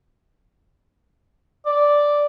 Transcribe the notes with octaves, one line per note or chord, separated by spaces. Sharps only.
D5